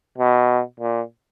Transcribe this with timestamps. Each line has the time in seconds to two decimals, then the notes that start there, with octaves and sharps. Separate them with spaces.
0.18 B2
0.80 A#2